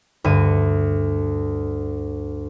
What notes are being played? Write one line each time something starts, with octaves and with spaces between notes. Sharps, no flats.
D2 G2 D#7